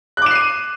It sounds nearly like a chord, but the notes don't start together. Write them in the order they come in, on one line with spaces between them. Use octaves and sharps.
F#6 D6 E7 C7 D#7